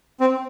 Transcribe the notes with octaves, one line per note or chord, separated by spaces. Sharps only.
C4